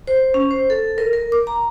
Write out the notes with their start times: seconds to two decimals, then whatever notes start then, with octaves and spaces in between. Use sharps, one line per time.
0.07 C5
0.34 C#4
0.51 C5
0.70 A4
0.98 A#4
1.13 A#4
1.32 D6
1.47 A#5